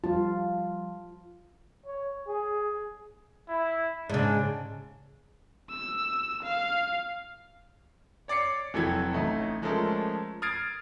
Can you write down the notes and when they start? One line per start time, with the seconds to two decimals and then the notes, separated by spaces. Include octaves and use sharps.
0.04 F3 G3 F4 A5
1.86 C#5
2.28 G#4
3.49 E4
4.10 G#2 C#3 D4
5.70 E6
6.43 F5
8.28 C#5 D5 D6 C7 C#7
8.74 F1 E3 F#3 A4 G5 G#6
9.13 A1 A3 D#4
9.62 F3 G#3 A3 C#4 A4 A#4
10.42 D#6 F6 G#6 A6 C7 D7